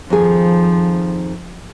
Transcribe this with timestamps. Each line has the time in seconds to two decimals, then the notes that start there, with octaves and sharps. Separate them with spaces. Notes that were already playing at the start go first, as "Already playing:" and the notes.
0.10 F2 D#3 F3 G#4